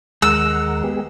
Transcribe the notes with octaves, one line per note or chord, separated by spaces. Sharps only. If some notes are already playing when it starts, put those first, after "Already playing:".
D#2 G#3 A#4 F#5 E6
B3 G4 G#4